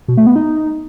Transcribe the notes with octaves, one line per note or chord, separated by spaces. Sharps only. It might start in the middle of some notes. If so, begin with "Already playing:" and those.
B2
A3
B3
D#4